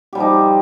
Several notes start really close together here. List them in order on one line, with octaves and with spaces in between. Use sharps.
G4 G3 F3 D#4